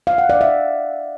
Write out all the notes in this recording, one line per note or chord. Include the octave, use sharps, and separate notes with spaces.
F5
F#5
D5
E5